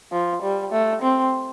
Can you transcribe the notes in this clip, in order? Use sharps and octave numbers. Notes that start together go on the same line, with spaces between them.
F3
G3
A3
C4